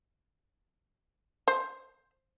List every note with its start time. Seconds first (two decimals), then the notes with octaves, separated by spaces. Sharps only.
1.48 C5